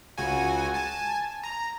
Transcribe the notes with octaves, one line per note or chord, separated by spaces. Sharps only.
C#2 F#4 G#5
G#5 A5
A#5